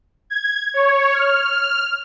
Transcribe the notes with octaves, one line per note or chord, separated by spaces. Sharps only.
G#6
C#5
F6